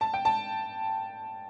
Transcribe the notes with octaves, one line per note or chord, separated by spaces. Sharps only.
A5
G5
A5